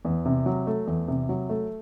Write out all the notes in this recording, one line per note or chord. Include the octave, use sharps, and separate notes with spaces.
E2
C3
F#3
A3
E2
C3
F#3
A3